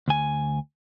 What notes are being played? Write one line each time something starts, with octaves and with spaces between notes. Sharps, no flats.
D2 G#5